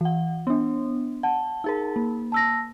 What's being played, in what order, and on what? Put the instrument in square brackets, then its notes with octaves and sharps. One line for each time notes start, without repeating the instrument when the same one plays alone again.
[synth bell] E3 F#5
B3 D4
[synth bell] F#5 [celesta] A5
[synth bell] D#4 G#4 A#4
A#3
[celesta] A5 E6 A#6